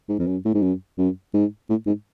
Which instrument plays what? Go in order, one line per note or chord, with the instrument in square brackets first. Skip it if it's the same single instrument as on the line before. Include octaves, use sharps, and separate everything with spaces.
[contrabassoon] G#2
F2
F#2
A2
G#2
F#2
F#2
G#2
A2
G#2